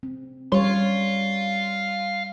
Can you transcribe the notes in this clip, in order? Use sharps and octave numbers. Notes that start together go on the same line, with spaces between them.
C4
G3 C#5 F5 C6